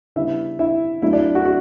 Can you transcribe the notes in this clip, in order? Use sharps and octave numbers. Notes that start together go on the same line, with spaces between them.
C#3 G3 B3 D4 E4 E5
E4 E5
F#3 A3 D4 E4 E5
D4 D5
F#4 F#5
F#4